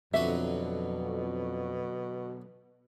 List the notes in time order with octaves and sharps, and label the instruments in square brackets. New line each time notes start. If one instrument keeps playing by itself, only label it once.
[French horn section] F2 [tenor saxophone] B2 [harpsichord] D3 F#3 B4 [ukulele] E5